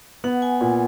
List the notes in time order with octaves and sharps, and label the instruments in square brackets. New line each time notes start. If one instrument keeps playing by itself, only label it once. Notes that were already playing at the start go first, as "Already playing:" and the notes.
[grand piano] B3 [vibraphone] F#5
[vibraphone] G#5
[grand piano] A#2